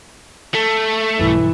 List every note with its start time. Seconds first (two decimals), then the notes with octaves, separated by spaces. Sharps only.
0.55 A3
1.19 B1 G2 E3